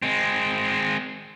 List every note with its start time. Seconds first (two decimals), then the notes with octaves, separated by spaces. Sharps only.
0.02 G#3 C4